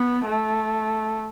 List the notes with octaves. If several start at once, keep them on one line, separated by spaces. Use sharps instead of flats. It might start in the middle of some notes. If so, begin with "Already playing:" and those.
Already playing: B3
A3